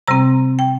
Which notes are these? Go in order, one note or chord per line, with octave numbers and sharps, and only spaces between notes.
C3 G3 C4 A#5
G5